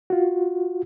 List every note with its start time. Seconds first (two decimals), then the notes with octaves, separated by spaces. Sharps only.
0.10 F4 F#4